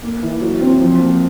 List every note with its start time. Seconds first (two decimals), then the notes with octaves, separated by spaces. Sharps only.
0.03 A#3
0.22 E3
0.41 F#3
0.61 C4
0.80 F3
0.99 A#3